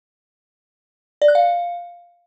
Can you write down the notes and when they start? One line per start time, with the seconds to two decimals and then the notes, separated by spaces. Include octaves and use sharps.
1.22 D5
1.28 F#6
1.35 F5